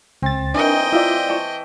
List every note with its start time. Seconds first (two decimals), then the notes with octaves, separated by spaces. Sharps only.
0.22 C#2 C4 A6
0.54 E3 D4 D#4 A#4 D#5 G5
0.92 E4 F4 D5 E5
1.29 A5 C#6